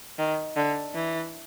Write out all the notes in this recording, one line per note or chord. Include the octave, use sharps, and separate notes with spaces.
D#3
D3
E3